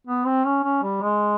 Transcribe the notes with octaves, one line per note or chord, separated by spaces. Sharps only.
B3
C4
C#4
C#4
G3
G#3